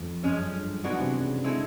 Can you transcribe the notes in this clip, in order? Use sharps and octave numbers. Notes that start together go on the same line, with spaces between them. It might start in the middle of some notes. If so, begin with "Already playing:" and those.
Already playing: F2
F#2 F3 G#3 C#4
F#2
G2
G#2 E3 G#3 B3 D4 F#4
C3
C#3
D3 G#3 C4 E4 A4